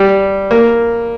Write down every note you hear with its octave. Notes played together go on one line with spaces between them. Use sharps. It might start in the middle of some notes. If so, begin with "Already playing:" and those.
Already playing: G3
A#3